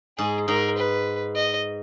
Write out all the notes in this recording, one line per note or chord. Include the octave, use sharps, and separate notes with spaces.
G#2 G#4
G#2 A#4
B4
D#5